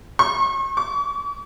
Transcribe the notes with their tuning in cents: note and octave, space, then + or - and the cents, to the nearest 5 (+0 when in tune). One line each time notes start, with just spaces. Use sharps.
C#6 -45
C#6 +45